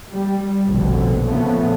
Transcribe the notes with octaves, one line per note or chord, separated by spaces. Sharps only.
G3
F1 A#1 B2 D3
A#2 C#3 F3 A3 B3